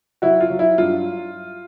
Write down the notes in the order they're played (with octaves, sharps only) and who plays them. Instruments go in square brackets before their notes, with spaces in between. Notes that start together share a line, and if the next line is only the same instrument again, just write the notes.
[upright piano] F#3 E4 F#4
F4
F#3
E4
G2 F4